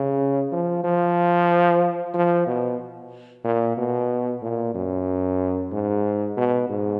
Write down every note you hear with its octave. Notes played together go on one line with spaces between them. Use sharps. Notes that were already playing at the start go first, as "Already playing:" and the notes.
Already playing: C#3
F3
F3
F3
B2
A#2
B2
A#2
F#2
G#2
B2
G#2